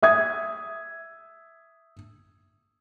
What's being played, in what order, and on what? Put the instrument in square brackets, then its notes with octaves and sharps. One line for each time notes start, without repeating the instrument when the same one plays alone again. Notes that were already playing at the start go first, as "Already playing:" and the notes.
[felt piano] E5 D#6 G#6